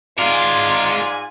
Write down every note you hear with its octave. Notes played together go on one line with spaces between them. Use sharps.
G#2 G#3 F4 A#4 D5 G#5